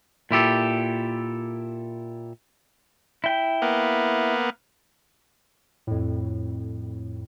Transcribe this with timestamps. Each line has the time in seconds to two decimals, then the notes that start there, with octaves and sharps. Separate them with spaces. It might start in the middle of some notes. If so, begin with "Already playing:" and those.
0.31 A#2 E4 G4 A4
3.24 E4 G5
3.62 A#3 B3
5.87 F2 A2